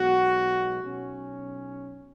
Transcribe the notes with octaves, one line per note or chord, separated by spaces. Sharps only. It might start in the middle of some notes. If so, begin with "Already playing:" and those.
Already playing: B1 B2 G#3 F#4
B1 B2 F#3 C#4